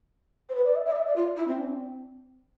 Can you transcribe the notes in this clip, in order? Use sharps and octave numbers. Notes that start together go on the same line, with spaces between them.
C5
B4
D5
E5
E5
D5
E5
D5
F4
E4
C4
D4
C4